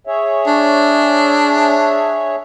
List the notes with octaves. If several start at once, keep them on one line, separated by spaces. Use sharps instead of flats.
G#4 C#5 E5
D4